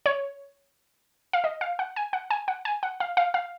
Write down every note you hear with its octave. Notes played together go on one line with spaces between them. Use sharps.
C#5
F5
D#5
F5
F#5
G#5
F#5
G#5
F#5
G#5
F#5
F5
F5
F5